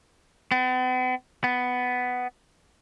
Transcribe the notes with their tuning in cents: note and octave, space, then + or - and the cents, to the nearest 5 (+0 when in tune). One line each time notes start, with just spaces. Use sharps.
B3 +45
B3 +10